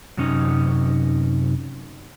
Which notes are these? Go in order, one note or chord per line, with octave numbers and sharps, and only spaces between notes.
F#2 C3 C#4 D#4